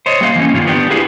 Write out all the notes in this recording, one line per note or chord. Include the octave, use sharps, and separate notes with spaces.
C5 C#5 D#5
G3 A#3 D#5 F5
E3 A#3 C#4
G2 D#3 A#3 F4
B3 D4 G4
E4 F4 G4 G#4 B4